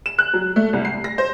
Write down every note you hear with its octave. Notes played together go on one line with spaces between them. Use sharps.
E7
F#6
F#3
A3
C2
C7
A#6
C5